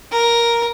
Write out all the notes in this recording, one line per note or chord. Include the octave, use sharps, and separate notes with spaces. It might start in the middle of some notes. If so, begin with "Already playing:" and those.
A#4